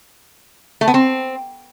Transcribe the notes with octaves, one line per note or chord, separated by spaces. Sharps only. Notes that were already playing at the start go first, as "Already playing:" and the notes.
A3
B3
C4